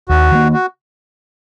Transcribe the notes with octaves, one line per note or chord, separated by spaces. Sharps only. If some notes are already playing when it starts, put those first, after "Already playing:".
D#2 F#4
D#3 F#3 A#3
F#4